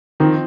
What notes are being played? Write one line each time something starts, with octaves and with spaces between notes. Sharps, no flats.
D#3 F3 C4 D#4